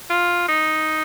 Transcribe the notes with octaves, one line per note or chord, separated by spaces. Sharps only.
F4
D#4